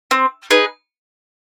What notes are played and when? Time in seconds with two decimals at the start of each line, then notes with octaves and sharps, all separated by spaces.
0.11 C4
0.51 D#4 G#4 B4